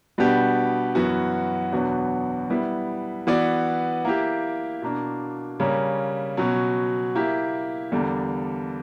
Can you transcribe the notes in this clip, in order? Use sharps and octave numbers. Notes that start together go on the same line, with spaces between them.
B2 G3 B3 D4 G4
F#2 E3 B3 F#4
E2 B2 F#3 B3 D4
G3 B3 E4
E3 B3 F#4 B4 D5
A#3 E4 G4
B2 A#3 D4
C#3 G3 A#3 C#4
B2 F#3 C#4
A#3 E4 G4
E2 D3 G3 A#3 D4